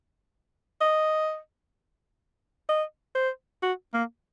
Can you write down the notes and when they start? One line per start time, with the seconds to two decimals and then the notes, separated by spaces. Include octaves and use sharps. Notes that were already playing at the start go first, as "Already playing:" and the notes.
0.81 D#5
2.69 D#5
3.15 C5
3.63 F#4
3.94 A#3